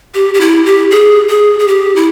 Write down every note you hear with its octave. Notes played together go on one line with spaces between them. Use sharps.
G4
G4
E4
G4
G#4
G#4
G#4
G4
E4